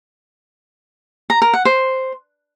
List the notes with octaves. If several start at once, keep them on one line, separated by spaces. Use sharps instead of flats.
A#5
A#4
F#5
C5